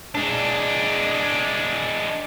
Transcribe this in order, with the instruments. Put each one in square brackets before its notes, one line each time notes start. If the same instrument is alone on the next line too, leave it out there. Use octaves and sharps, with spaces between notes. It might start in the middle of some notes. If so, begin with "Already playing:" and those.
[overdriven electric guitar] G#3 D4